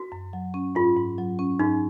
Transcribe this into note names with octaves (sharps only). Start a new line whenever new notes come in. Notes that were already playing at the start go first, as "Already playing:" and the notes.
Already playing: F#4
F#2
F#3
C#4
G#2 F4
G#2
F#3
C#4
G#2 D#4